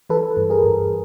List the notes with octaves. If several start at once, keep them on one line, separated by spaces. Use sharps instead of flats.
E3 A4 B4
G2
G#4 A#4
G2